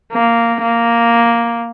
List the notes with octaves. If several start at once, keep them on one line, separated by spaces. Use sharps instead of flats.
A#3
A#3